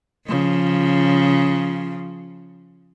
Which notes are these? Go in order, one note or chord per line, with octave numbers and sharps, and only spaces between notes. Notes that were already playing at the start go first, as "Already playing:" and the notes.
C#3 F3